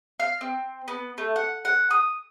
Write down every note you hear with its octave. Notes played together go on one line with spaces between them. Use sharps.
F5
C4
B3
A3
F#5
F#5
D#6